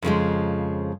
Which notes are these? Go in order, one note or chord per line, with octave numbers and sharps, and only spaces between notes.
F2 C#3 F3 G#3